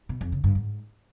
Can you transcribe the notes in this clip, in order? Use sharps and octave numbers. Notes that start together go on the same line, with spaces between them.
B2
F2
C#3
G2
G#2